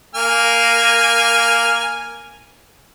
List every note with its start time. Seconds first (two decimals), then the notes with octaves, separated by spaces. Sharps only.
0.15 A#3 G#5 F6